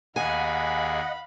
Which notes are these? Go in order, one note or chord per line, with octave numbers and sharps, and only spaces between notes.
D#2 G#4 D#5 F5 F#5 G#5 B5